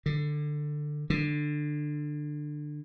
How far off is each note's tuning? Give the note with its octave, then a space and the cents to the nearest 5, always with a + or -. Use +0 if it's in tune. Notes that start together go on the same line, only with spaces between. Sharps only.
D3 +15
D3 +20